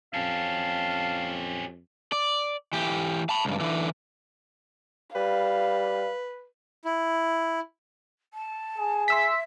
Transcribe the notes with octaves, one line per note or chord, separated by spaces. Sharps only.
F2 C#4 G4 F5 A5
D5
E3 G4
A5 B5
C#2 G2
D3 E3
G3 B4 F5
E4
A5
G#4
E5 C6 E6 B6